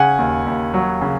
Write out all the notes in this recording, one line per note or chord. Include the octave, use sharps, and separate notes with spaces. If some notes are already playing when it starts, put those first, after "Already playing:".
Already playing: C#3 F#5 G#5
D#2
D#2
F#3
C#3